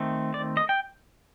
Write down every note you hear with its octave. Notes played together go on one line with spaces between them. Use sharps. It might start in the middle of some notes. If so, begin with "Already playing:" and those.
Already playing: D#3 A3 C4
D5
D#5
G5